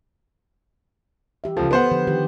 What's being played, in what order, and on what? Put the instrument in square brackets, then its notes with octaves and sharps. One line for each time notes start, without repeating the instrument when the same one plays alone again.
[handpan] E3 G4 E5
[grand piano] C#2 F3 [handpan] A4
[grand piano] B3 C5 F#5
[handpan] D3 F3 G4
D#3 F4 G4